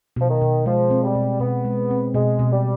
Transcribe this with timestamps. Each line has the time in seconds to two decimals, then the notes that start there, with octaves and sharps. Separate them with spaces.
0.16 B2 F3
0.29 D#3
0.41 B2
0.66 F3 G#3
0.90 C4
1.03 G3
1.15 B2
1.40 B2 B3
1.65 G#3
1.91 C4
2.14 B2 G#3
2.39 B2
2.52 G3